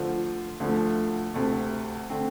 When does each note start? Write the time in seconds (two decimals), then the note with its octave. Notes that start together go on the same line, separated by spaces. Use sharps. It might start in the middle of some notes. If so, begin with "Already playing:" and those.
Already playing: D3 F3 A3 F4 C5
0.60 D2 D3 F3 A3
1.34 D2 C3 A3
2.10 D3 A3 C4